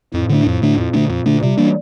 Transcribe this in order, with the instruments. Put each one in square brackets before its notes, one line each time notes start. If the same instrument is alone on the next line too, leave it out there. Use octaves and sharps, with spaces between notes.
[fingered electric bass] F2 [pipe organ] A2
[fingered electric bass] D3 A3 D4
F2
D3 A3 D4
[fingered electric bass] F2 [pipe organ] A#2
[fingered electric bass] D3 A3 D4
F2
D3 A3 D4
[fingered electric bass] C3 [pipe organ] G3
[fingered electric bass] E3 A#3 D4